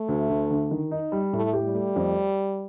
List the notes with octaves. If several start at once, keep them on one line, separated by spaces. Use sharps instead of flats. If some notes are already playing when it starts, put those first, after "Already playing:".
Already playing: A3
D2
D2
D3
D#3
D#4
G3
A2 A3
G4
G3
A3
F2